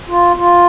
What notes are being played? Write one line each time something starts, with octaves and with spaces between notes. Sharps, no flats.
F4
F4